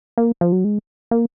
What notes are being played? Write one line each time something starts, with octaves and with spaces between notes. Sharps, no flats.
A#3
F3
F#3
G#3
A#3